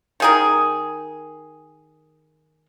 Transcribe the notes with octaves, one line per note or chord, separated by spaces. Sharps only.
D#3 G#4 A#4